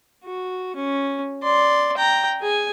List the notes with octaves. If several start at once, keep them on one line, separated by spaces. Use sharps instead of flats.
F#4
C#4
D5 C6
G5 A#5
G#4 G#5